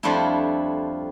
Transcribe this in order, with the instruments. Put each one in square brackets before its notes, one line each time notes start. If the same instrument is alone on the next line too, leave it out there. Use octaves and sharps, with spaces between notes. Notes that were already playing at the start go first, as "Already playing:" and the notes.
[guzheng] F2 F3 G3 A3 D4 E4